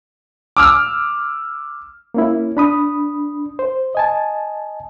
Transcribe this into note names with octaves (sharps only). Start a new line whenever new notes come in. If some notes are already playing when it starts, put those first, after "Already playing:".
D6 E6 F6
A#3 C#4 E4
D4 B5 D#6
C5
D#5 G#5 A5